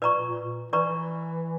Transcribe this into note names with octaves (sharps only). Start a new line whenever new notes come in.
A#2 B4 D5 A#5 C#6
A#2
E3 B4 D5 A#5 C#6